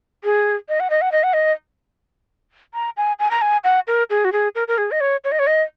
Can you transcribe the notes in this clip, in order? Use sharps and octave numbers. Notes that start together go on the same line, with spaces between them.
G#4
D#5
F#5
D#5
F#5
D#5
F#5
D#5
A#5
G#5
G#5
A#5
G#5
F#5
A#4
G#4
F#4
G#4
A#4
A#4
G#4
D#5
C#5
C#5
D#5
C#5
D#5